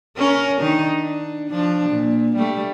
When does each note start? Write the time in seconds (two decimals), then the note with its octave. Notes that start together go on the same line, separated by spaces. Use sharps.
0.17 C#4 A#4
0.60 D#3 D4 D#4
0.97 D4
1.49 F3 D4
1.89 A#2
2.36 G3 A3